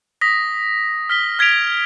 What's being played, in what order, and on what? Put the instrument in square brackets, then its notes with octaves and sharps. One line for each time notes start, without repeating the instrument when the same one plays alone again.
[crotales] D#6 A#6 B6
F6 B6 G7
F6 G#6 B6 D7 F7 G7